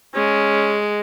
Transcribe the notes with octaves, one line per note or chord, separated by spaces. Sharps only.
G#3 C#4